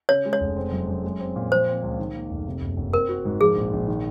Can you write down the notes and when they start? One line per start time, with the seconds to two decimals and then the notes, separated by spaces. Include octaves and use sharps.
0.09 C#3 C#5
0.26 G#3
0.33 C#5
0.40 F1
0.57 C4
0.72 F#2
0.88 F#2
1.04 G#3
1.20 C4
1.36 A#2
1.51 F3 C5
1.67 C4
1.82 C#2
1.99 D#3
2.14 A#3
2.30 F1
2.46 C3
2.62 F#1
2.77 F#1
2.93 C4 A#4
3.09 F#4
3.25 G#2
3.41 F3 G#4
3.56 A#1
3.73 A#1
3.88 D#3